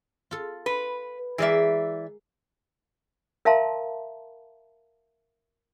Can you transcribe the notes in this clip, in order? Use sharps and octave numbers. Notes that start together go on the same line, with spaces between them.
F4 A4
B4 C6
E3 G#3 A#4 D5 E5 F5
A#4 E5 F5 A5 A#5 C6